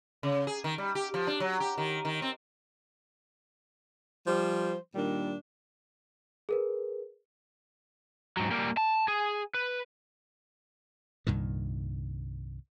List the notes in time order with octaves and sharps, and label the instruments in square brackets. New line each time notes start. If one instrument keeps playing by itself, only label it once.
[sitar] C#3
G#4
D#3
G3
G4
F3
D4
F#3
G4
D#3
D#3
C4
[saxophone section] F3 G3 C5
A#2 D#3 G3 D4
[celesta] G#4 A#4 B4
[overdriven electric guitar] G#2 F#3
G3 A#3
A5
G#4
B4
[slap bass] C2 G2 A#2 D#3